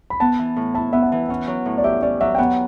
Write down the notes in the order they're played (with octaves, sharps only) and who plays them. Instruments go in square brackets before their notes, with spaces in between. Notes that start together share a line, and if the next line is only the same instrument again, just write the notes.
[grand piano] B5
[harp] B3 [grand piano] A5
[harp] E3
A2
[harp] E4 [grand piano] A5
[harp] B3 [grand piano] E5
[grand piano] F#5
[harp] E3
[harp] C#4 [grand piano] F#5
[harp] F#3
A2
[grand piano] D5
[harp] G4 [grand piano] E5
[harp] C#4 [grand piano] D5
[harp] F#3 [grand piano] E5
[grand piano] G5
[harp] B3 [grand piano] F#5